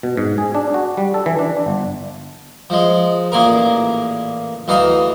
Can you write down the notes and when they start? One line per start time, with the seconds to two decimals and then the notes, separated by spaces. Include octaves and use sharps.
0.03 B2
0.17 G#2
0.38 G#4
0.55 D4
0.74 F#4
0.97 G3
1.14 A4
1.26 E3
1.39 D4
1.66 G1
2.70 F3 G#3
3.32 A1 A#2 A#3 G#4 A#4
4.68 D2 E3 D#4 F5 D#6